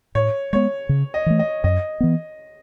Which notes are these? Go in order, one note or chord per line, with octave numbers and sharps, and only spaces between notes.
A2 C#5
G#3 B3 C#5
C#3
D#5
E3 A3
D#5
F#2 D#5
E3 B3